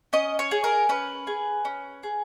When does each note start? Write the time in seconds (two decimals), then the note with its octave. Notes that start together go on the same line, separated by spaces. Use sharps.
0.13 C#4 D#5
0.39 C#5
0.51 G#4
0.64 A#4
0.89 C#4 B4
1.27 G#4
1.65 C#4
2.03 G#4